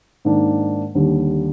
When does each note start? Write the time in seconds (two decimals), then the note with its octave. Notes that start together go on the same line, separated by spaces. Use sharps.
0.25 G#2 D#3 A#3 D4
0.95 D#2 D3 G3